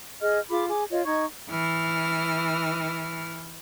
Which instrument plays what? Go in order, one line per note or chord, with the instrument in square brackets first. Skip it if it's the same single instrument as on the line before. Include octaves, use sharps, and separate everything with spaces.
[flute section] G#4 D#5 F6
F4 G#4 B5 D6
G#4 G#5 D6
F4 C#5 D#5
D#4 D#5 C#6 G#6
[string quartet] E3 F6